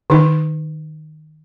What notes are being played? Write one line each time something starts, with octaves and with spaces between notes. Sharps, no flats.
D#3 D#4